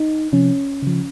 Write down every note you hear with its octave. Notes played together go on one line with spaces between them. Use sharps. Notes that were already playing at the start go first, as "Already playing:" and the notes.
Already playing: D#4
C3 F3 C#4
C#3 F3